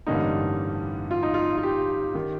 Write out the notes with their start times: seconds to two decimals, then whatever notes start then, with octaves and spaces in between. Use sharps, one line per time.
0.07 A1 G2 D3 G3 A#3 D#4
1.11 F4
1.23 D#4
1.34 F4
1.58 F4
1.63 G4
2.15 D#3